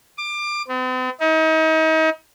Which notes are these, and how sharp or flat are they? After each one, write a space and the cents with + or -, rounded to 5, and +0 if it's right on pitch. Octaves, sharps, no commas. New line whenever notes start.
D6 +25
C4 -45
D#4 +35